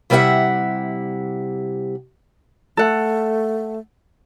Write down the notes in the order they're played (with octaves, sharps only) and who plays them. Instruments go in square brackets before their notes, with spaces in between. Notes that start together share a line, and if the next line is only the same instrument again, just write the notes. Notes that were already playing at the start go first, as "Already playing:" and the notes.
[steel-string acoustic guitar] C3 G3 E4 B4 E5 F#5
[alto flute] A3 [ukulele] A4 F#5